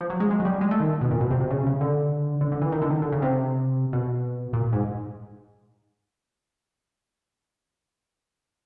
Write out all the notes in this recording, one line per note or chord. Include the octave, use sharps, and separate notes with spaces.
F3
F#3
G#3
G#3
F#3
G3
G#3
A3
D#3
B2
A#2
B2
C3
C3
C#3
C#3
D3
D3
D3
E3
D#3
D3
D#3
D3
C#3
C3
B2
A#2
G#2